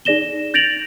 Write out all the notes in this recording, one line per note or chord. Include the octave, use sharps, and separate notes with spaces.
D#4 G#4 D5 A#6 E7 G7
G6 A6 A#6 D7 F7 F#7